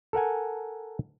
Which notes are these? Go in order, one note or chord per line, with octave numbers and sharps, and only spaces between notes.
A4 A#4 F#5 G#5